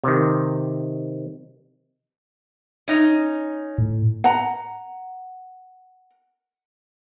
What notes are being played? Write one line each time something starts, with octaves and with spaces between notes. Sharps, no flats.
C3 D#3
C#4 D#4
A2
F#5 A#5